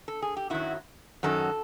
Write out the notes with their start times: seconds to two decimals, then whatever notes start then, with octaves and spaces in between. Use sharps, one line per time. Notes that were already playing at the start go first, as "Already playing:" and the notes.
0.08 A4
0.22 G#4
0.37 G4
0.50 F#2 D#3 F#3 E4 F#4
1.23 F#2 D#3 F#3 A4